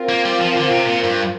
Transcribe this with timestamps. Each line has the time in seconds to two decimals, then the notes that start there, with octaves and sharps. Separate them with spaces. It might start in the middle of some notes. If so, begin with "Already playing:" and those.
Already playing: C4 F4 A#4
0.09 A#3
0.25 G3
0.41 F3
0.57 D3
0.72 C3
0.88 A#2
1.04 G2